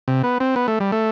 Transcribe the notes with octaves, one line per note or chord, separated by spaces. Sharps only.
C3
B3
C4
B3
A3
G3
A3